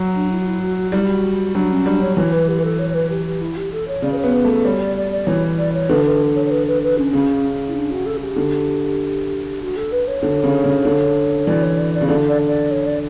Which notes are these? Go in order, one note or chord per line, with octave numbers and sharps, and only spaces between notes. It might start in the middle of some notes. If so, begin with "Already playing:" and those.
Already playing: F#3
D4
E4
F#4
E4
F#4
F#4
G3 E4
F#4
F#3 D4
C#4
G3 D4
C#5
E3 C#5
B4
G4
B4
A4
C#5
C#5
B4
G4
G4
E4
G4
A4
C#5
C#3 D5
B4
C#5
B3
B4
A3
A4
G3 C#5
D5
D5
D5
E3 C#5
D5
C#5
D3 B4
B4
C#5
C#5
B4
B4
B4
C#4
C#3
E4
D4
F#4
A4
F#4
G4
D3
F#4
A4
B4
C#5
D3
C#3
C#3
D3
E3 D5
C#5
D5
D5
C#3
D3 D5
D5
D5
C#5
D5